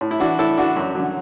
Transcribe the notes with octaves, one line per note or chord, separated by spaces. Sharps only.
A2
E4
E3 D4 F#4
A2 E4 A4
E3 D4 F#4
F#2
D3 F#3